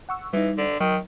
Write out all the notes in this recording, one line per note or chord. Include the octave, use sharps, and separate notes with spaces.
F#5 C#6 E6
E3 G3 D#4
D3
D#3 F#3